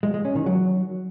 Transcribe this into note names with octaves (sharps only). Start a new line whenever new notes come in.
G#3
G#3
C#4
D#3
F#3